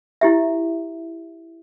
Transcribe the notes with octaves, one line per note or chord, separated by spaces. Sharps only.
E4 G4 E5